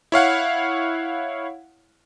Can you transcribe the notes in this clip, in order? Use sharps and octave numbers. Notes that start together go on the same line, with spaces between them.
E4 C#5 F5 F#5